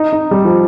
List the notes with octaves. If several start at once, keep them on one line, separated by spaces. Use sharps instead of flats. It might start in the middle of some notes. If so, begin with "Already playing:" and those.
Already playing: D#4
D#4
G3
F3